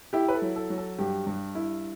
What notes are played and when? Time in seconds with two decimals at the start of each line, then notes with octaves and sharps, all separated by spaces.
0.13 E4 G4
0.28 B4
0.35 A4
0.42 F#3
0.56 A4
0.70 F#3
0.78 A4
0.98 G2 G4
1.27 G2
1.55 E4